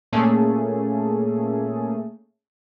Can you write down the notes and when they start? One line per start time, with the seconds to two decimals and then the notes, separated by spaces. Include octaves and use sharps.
0.12 A#2 A3 A#3 C#4 G#4 A4